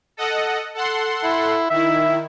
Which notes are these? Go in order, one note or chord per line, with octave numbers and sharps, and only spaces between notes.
A4 D#5 F#5
A4 F#5 C6
E4
D#3 E4 E5